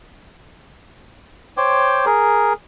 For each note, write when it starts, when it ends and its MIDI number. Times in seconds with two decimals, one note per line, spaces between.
1.57 2.05 72
1.57 2.05 73
1.57 2.05 79
1.57 2.05 86
2.06 2.53 68
2.06 2.53 70